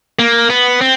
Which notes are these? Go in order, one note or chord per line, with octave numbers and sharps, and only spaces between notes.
A#3
B3
C4